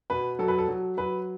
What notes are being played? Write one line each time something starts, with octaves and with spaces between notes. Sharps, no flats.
B2 B4
F#3 A4
B4
A4
F#3
F#3 B4